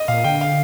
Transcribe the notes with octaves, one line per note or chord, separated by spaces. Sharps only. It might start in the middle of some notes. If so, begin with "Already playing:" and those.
Already playing: D#5
A#2 F5
D3 G5
F5